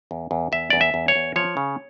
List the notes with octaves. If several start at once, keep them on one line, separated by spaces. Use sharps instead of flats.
E2
E2
E2 E5
E2 D5
E5
E2
C#5
E2
F3 C#5
C#3